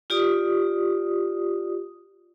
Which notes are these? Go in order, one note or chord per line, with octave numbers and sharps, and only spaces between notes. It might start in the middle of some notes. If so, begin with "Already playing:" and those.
F4 G4 D5 D#6